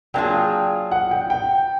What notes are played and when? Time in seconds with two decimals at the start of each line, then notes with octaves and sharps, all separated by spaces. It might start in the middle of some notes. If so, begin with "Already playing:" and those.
0.14 F#3 A#3 D4 F4 G#4 G5
0.91 F#5
1.11 G5
1.30 G5